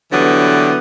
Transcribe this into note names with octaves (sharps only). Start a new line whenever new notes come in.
D3 E3 F#3 G3 B3